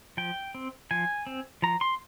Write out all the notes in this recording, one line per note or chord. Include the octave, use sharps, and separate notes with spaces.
F3 G5
C4
F3 G#5
C4
F3 A#5
C6